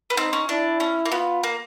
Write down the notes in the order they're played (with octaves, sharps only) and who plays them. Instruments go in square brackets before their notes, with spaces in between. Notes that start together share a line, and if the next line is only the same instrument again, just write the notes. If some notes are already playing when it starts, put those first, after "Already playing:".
[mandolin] B3
[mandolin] C4 [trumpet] D#4
[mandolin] C#4
[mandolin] D4 [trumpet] E4
[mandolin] C#4
A#3
[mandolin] B3 [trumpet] F4
[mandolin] A#3